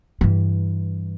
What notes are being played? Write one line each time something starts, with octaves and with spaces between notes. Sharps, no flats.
G2 E3